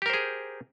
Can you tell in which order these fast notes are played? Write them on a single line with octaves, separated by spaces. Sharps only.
G4 A#4 C5 G#4